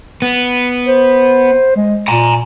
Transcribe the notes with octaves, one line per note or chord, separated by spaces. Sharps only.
B3
C5
G#3
A#2 G#5 A#5